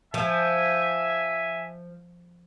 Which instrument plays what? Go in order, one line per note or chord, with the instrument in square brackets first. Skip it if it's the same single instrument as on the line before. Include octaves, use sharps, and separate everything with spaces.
[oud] F3 [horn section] E5 G#5